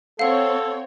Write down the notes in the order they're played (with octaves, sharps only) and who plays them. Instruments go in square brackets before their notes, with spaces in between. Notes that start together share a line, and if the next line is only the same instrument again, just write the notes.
[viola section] C4 C#5 [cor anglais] A4 [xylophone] F5 F#5